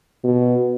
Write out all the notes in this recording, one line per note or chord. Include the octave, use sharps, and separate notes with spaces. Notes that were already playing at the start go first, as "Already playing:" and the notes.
B2